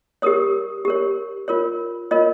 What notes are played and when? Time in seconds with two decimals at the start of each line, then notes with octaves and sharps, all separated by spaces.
0.22 G4 A#4 C#5 D#6
0.85 G4 A#4 C#5
1.48 F4 A#4 C#5
2.11 F4 A#4 C#5 D#5